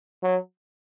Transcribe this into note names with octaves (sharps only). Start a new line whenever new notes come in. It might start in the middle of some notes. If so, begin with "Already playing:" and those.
F#3